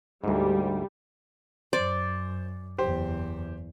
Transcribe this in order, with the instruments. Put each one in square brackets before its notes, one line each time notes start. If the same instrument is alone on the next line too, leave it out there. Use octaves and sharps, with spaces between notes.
[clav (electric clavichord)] D2 G#2 [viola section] G3
[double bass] F#2 [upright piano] C5 [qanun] D5
[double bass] F#1 E2 [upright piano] G4 C5